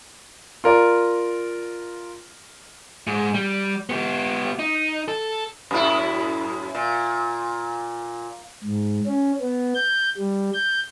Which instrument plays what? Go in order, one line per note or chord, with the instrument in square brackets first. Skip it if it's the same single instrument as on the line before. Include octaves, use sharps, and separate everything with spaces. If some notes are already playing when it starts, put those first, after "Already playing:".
[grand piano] F4 A#4 D5
[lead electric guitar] G#2
G3
B3 G4
D#4
A4
[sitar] F#2 A2 E4
A#2
[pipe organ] G#2
C#4
B3
G6
G3
G6